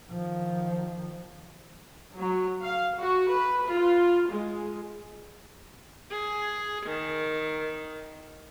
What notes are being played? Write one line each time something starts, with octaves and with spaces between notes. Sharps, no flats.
D#3 F3
F#3
F5
F#4
B4
F4
G#3
G#4
D#3